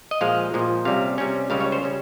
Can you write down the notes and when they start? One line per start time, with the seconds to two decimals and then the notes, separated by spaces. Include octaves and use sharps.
0.11 D#5
0.21 A#2 F3 G#3 F5
0.54 A#2 F3 G#3
0.85 C3 G3 C#4 F5
1.18 C3 G3 C#4
1.50 C#2 C#3 G3 C#4 F5
1.60 C#5
1.72 C5
1.83 C#3 G3 C#4